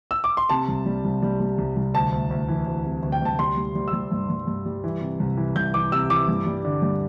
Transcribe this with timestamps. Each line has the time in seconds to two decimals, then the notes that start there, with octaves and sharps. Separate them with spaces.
0.11 E6
0.24 D6
0.37 C6
0.49 C3 A5
0.68 C2
0.86 G3
1.04 C2
1.22 G3
1.40 G3
1.58 C2
1.76 C2
1.94 D2 A5
2.12 D2
2.31 D2
2.48 E3
2.67 D2
2.85 C3
3.03 D2
3.12 G5
3.21 D2 A5
3.39 G3 C6
3.57 G3
3.75 G3
3.88 E6
3.93 G3
4.11 G2
4.30 G2
4.47 G2
4.66 G3
4.84 E3
5.02 C3
5.20 C2
5.37 E3
5.56 C2 G6
5.74 E3 D6
5.92 C3 E6
6.10 E3 D6
6.28 G2
6.46 G3
6.65 D3
6.82 G2